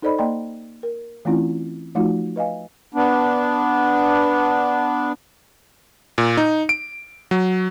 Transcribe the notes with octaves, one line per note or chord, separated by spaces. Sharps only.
D#4 A4 C5 D5 D#5 B5
A#3 D5 D#5 G5 A#5 C6
A#4
E3 A3 C4 C#4 E4 F4
F3 A3 D#4 F4 F#4
B4 D#5 F5 G#5
B3 D4
A#2
D#4
D7
F#3